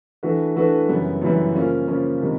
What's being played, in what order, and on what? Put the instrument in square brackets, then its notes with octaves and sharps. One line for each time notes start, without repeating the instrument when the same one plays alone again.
[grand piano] E3 A3 D4 F#4 B4
E3 A3 D4 F#4 B4
F#2 C#3 E3 G3 B3
F#2 C#3 E3 G3 B3
C#3 F3 A#3 C#4 F4
C#3 F3 A#3 C#4 F4
C3 D#3 G3